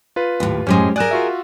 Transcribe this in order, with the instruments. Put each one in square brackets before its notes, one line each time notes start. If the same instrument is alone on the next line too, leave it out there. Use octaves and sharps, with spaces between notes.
[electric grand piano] F4 B4
[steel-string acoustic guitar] D#2 A2
[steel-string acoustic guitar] F#2 A2 G#3 [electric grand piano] C#4 G4 C5
[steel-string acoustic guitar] G#4 A#4 [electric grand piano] D5 F#6 E7
[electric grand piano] F4 F#4 E5